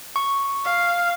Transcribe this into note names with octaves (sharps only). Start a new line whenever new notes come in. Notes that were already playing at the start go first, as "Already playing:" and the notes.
C#6
F5